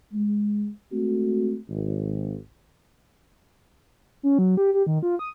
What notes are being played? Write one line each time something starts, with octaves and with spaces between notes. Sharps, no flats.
G#3
G#3 A3 C4 F#4
G#1
C#4
F#3
G4
G4
D#3
F4
D#6